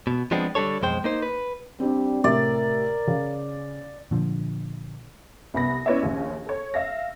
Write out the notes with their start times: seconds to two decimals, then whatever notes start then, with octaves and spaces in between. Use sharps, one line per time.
0.07 B2
0.31 F3 G#3 B3 C4 D4
0.55 D3 G3 D4 A4 C#5
0.81 B1 F2 G#3 C5 G5
1.04 A#3 D#4 C5
1.22 B4
1.80 G3 C4 D4
2.24 A2 C3 A#4 D5 E5
3.07 C#3 F5
4.11 A#2 D3 F3
5.54 C2 B3 B5 A#6
5.86 C#4 E4 B4 C#5 D5 E5
6.02 A#1 D#2 C#4 C#5
6.46 A4 C#5
6.74 E5 F5 A#6